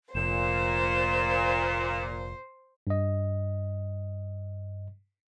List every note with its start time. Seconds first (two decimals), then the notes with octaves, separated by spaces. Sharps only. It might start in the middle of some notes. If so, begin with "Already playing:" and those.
0.15 F1 A#2 C5 E7
2.87 G2 D#5